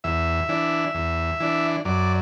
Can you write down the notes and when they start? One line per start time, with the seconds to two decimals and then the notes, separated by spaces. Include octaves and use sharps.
0.04 E2 E5
0.49 E3 D4
0.95 E2
1.40 E3 D4
1.85 F#2 D5